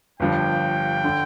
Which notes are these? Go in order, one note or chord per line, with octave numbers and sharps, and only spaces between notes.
G1 G2 F3 G5
D3